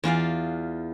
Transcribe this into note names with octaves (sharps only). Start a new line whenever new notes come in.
E2 F4 D5 F5